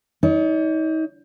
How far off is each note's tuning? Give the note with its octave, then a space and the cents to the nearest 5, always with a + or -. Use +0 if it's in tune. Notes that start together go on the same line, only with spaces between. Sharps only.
D#4 +35 D5 -40